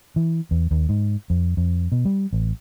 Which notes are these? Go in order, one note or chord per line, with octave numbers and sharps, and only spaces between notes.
E3
E2
D#2
G#2
F2
F2
B2
G3
A1